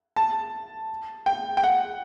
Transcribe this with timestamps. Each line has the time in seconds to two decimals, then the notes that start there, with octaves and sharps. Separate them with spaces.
0.16 A5
1.26 G5
1.57 G5
1.63 F#5